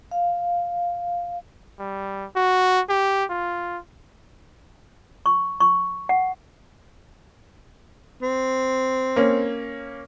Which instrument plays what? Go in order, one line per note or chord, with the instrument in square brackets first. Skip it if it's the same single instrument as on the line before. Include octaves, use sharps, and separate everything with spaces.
[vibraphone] F5
[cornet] G3
F#4
G4
F4
[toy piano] C#6
C#6
F#5
[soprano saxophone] C4
[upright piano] A#3 C#4